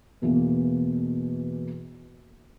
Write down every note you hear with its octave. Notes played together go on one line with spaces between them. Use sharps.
E2 B2 E3 A#3